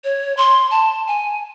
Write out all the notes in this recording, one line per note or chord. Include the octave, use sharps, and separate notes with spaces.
C#5
C6
A5
G#5